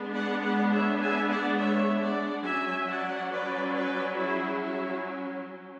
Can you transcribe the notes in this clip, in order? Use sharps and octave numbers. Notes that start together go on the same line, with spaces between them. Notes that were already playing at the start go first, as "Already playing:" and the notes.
Already playing: G#3 B3 D4
D5 F#5
D5 F#5
C#5 E5
E5 G#5
D5 F#5
C#5 E5
D5 F#5
F#3 C#4 E5 G#5
D5 F#5
B4 D5
B4 D5
E4 G#4
E4